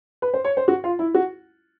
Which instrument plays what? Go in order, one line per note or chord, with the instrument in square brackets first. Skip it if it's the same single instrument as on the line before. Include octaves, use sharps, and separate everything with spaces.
[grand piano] B4
C5
C#5
C5
F#4
F4
E4
F#4